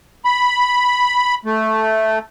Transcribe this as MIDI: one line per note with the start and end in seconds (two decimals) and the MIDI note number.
0.25 1.34 83
1.45 2.19 57